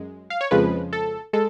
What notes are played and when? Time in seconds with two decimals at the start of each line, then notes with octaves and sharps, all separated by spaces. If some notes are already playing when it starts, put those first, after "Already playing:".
Already playing: F#2 G#3
0.30 F5
0.41 C#5
0.51 F2 C#3 F3 G#3 B4
0.93 A4
1.33 G#3 A4